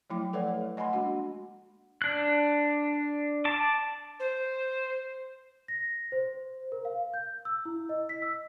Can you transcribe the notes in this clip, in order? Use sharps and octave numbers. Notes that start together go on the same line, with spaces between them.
F3 F#3 A3 E4 G5 D6
A4 B4 C#5 D5 F#5
A3
D#5 F#5 G#5 B5 C6
G#3 A#3 D4 F#4 F#5
D4 F#6
A5 D6
C5
A#6
C5
A#4
F5
G6
E6
E4
D#5
B6
E6